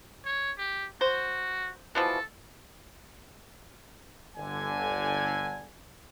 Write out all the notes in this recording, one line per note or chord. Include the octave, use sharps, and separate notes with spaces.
C#5
G4
F#4 C5
B2 E3 F3 A4
G1 D3 G#5